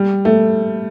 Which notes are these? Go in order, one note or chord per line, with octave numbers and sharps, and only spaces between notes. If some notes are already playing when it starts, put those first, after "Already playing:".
Already playing: G3
A3